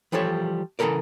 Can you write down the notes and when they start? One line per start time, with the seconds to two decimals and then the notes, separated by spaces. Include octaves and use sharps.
0.12 E3 F3 G3 A4 C#5
0.79 C#3 E3 F3 A4 A#4 D5